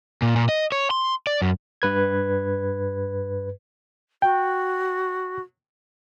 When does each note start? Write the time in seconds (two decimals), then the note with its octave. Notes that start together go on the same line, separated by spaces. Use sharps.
0.22 A#2
0.36 A#2
0.49 D#5
0.72 C#5
0.91 C6
1.27 D5
1.42 F#2
1.82 G2 B4 G#6
4.22 F#4 G5